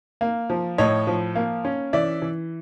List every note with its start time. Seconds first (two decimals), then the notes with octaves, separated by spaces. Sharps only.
0.21 A#3
0.50 F3
0.78 A2 C#5 D#5
1.07 F3
1.35 A#3
1.65 C#4
1.93 E3 D5 E5
2.22 E3